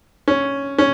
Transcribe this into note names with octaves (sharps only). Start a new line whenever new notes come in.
C#4
C#4